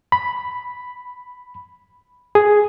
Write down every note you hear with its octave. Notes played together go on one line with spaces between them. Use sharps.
B5
G#4